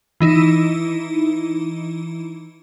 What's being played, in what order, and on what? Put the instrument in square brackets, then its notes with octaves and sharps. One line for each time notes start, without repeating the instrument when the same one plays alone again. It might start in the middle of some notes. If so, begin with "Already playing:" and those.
[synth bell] E3 D#4 E4